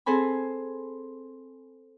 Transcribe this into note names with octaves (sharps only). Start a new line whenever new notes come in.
C4 G#4 A4 C5 G#5 B5